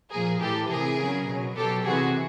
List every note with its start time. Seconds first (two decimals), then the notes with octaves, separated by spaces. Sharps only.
0.11 A#2 F3 G#4 A#4
0.39 A2 E3 G4 A4
0.70 C3 E3 G#4 A#4
0.98 C#3 F#3
1.27 B2 F#3
1.56 B2 F#3 G4 A4
1.85 C3 E3 F#4 G#4